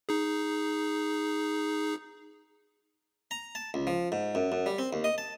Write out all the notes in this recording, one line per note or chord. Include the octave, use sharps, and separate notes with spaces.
D#4 G#4
A#5
A5
C#2
F3
G#2
F#2
F#2
G3
C4
D#2
D#5
A5